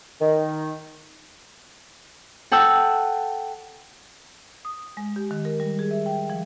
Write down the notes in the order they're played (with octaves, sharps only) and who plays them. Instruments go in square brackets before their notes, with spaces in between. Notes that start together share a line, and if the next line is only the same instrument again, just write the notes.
[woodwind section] D#3
[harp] A4 F#5 G5 E6
[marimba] D#6
G#3
G4
D#3
A#4
G3
G#4
E5
G5
F3